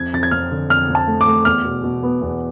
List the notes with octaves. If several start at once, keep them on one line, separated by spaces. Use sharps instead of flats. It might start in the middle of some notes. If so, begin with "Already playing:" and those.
Already playing: F2 G#6
F2 A6
G#6
F2 F6
D3
F2 F6
F2
A5
A3
D6
A3
E2 F6
B2
B2
B3
E2